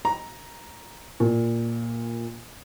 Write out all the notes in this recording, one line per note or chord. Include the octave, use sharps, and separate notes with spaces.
A#5
A#2